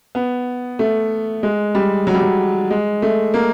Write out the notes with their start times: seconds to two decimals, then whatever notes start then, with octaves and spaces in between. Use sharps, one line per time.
0.15 B3
0.79 A3
1.43 G#3
1.75 G3
2.07 F#3
2.14 G3
2.22 F#3
2.71 G#3
3.02 A3
3.34 A#3